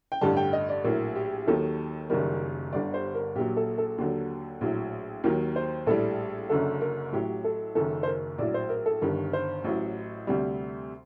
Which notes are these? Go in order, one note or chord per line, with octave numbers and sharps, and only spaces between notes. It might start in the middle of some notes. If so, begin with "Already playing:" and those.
G5
A1 G2 D3 G3 A5
G5
D#5
D5
A#1 A2 F#3 A#4
G4
D#2 D#3 F#3 A4
F#1 F#2 D#3 G3 A#4
G1 G2 D3 G3 D5
C5
A#4
A#1 A#2 F#3 G4
A4
A4
D#2 D3 F#3
A#1 A2 F#3
D#2 D#3 F#3 A#4
C5
A#1 A2 G3 A4
F#1 F#2 D3 A4
A#4
A1 A2 F#3 G4
A4
F#1 F#2 D#3 A4
C5
A#4
A#1 A2 F#3 D5
C5
A#4
A4
G1 G2 D#3 A#4
C5
A1 A2 F#3
D2 C3 G3